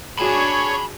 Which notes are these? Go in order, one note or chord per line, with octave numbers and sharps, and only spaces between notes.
D4 F#4 G#4 C#5 A5 B5 D6